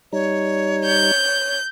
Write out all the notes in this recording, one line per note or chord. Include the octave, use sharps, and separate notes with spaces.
G3 D#4 C#5
G6